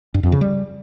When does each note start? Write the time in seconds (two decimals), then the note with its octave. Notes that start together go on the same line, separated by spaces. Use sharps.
0.14 G2
0.23 F2
0.32 C#3
0.41 G3